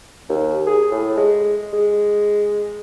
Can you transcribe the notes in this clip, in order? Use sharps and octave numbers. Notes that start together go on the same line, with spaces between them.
D#2
G#4
A2
G#3
G#3